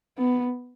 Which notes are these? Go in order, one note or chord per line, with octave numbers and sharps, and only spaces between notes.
B3